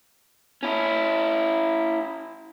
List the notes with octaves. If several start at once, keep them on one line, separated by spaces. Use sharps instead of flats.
C#4 E4